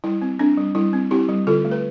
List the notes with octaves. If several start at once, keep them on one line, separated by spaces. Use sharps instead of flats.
G3 E4
C4
C4 D4
G3
G3 E4
C4
C4 E4 G4
G3
D3 F4 A4
A3
B4